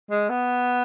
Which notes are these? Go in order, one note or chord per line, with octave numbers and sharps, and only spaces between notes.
G#3
B3